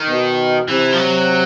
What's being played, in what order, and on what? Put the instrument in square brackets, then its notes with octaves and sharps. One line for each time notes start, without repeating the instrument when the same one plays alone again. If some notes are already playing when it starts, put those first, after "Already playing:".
Already playing: [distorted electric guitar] D#3
[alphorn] B2
[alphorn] C3 [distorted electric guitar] E3
[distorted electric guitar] F3
F#3